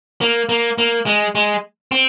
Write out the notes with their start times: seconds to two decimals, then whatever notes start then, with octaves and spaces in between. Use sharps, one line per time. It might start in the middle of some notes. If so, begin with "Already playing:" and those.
0.21 A#3
0.49 A#3
0.78 A#3
1.06 G#3
1.35 G#3
1.92 C4